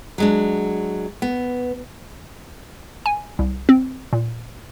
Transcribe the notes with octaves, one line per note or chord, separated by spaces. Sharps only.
F#3 G#3 D4
B3
G#5
C2
C4
A#2